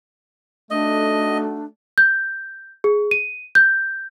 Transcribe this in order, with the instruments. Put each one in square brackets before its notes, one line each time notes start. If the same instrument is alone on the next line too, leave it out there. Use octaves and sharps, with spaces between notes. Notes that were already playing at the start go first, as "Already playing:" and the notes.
[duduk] A3 [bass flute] D4 [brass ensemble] D#4 F#4 A4 [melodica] D#5
[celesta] G6
G#4
D#7
G6